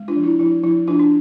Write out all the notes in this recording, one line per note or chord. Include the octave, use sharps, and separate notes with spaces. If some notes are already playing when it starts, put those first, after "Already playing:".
Already playing: G#3
D4 F4
F3
E4
F3 E4
F3 E4
F3 D4 F4
D4